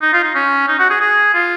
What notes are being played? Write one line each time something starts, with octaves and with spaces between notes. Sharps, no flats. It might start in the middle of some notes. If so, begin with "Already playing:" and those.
D#4
F4
D#4
C#4
D#4
F#4
G#4
G#4
F4